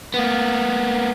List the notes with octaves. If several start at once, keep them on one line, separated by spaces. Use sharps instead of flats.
A#3 B3